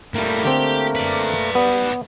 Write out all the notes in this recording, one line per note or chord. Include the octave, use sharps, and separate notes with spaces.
A2 G3 A3 A#3 A#4
D3 C4 G4
B4 D5
G3 B3